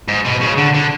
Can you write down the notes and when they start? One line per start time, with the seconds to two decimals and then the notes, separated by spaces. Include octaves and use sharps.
0.08 G#2
0.25 B2
0.41 C#3
0.58 D3
0.74 D3